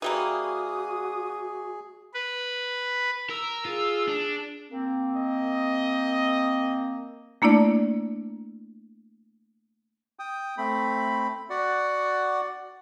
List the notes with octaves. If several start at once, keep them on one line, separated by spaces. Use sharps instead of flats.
E3 G3 A#3 F#4 G#4 D#6
B4
A#4 E6
F4 G#4
D4
A#3 C4
D#5
A3 A#3 D4 E4 D5
G5 D#6
A3 C4 B5
F#4 D5 F#5